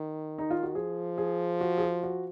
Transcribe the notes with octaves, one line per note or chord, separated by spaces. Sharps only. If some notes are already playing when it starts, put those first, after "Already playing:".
Already playing: D#3
D#4
F4
F#4
F3 G#4
G#4
F#4
G#4
F#4
F#4